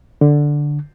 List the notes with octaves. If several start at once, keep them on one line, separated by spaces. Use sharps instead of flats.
D3